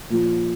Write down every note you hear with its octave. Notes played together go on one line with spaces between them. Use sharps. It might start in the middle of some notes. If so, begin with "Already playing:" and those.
A#2 F3